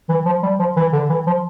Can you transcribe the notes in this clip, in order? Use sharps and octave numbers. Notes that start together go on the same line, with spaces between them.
E3
F3
G3
F3
E3
D3
E3
F3